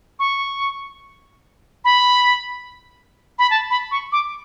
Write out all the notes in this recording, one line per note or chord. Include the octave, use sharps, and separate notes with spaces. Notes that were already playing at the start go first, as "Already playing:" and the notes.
C#6
B5
B5
A5
B5
C#6
D6